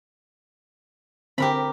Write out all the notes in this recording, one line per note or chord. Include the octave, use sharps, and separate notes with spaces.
D3 C4 G4 A#4 B5